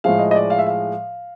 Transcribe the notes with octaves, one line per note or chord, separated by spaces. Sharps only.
A2 F3 G#3 F5
D#5
D#5
D5
F5
E5
F5